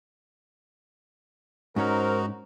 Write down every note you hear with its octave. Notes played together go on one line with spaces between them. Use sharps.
G#2 C#4 D#4 F#4 A#4 C5 C#5